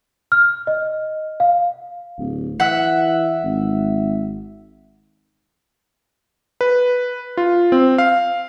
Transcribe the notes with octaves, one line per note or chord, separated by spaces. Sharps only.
F6
D#5
F5
D1
E3 E5 F#5
G#1
B4
F4
C4
F5